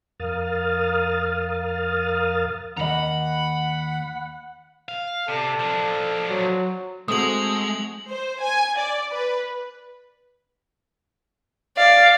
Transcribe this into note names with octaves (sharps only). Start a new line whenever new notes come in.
F2 A#4 F5 D#6 F6 A6
D#2 D#5 F#5 A#5 B5
F5
C3 A4 D5
F3 D4
F#3
G#3 A3 C4 F#4 D#6 F#7
C5
G#5
D5
B4
D5 F5